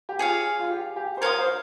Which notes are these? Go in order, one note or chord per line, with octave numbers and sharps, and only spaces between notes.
G4
F4 G#4 C#5 F5
F4
G4
G4
C5
A#4 C#5 F5 C6 D#6
C5